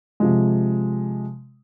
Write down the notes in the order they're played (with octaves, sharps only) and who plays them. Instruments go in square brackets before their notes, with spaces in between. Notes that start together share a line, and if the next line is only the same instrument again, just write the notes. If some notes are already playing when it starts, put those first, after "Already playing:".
[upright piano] C3 F3 G#3